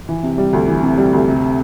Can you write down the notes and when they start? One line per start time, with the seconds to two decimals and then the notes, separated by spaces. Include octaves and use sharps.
0.09 E3
0.23 C3
0.38 G3
0.53 D2
0.67 E3
0.83 C3
0.98 G3
1.13 D2
1.28 C3